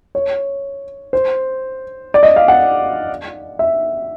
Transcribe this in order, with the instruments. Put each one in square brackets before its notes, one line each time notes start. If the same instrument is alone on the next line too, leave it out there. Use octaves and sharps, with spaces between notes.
[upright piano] C#5
C5
D5
D#5
F5
F#5
E5